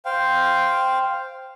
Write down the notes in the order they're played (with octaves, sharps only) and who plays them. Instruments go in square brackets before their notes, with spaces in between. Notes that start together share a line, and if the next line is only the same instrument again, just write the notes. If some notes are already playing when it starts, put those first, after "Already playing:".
[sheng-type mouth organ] C5 F5 G5